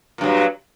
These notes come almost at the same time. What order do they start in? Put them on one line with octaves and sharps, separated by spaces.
A#2 G2 F#3